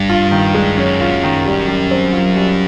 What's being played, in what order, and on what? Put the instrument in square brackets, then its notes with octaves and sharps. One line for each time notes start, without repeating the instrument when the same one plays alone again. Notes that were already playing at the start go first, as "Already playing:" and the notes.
Already playing: [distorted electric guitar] G2
[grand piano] F4
D#3
G#3
[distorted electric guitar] F#2 [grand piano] C#4
[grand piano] F4
D#3
G3
G3
C4
F4
G3